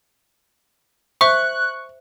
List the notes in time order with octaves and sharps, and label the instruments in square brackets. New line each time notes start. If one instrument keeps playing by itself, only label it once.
[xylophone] C5 E5 [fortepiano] C#6 [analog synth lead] F#6